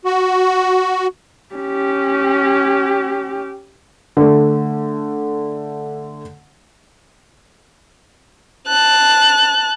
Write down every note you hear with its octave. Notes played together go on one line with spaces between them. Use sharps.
F#4
C#4 G4
D3 A3
A5 F#6